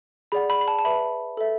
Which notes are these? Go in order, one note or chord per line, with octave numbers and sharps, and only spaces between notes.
G#4 D5 F#5 B5
B5
B5
A5
A5
B4 E5 B5
A4 E5